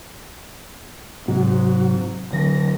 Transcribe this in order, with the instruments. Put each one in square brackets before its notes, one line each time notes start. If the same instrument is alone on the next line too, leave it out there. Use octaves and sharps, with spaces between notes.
[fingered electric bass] G#2 [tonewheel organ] C3 F#3 F#4
[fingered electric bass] D3 F#3 [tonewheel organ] A#6